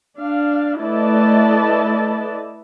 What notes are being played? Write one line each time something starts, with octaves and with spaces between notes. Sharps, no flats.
D4 F5
A3 E4 B4 D5 D#5 A5